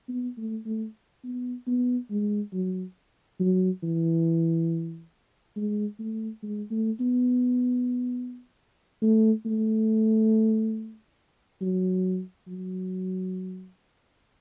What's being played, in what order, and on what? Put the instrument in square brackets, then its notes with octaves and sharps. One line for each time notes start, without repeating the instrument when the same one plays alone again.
[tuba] B3
A3
A3
B3
B3
G#3
F#3
F#3
E3
G#3
A3
G#3
A3
B3
A3
A3
F#3
F#3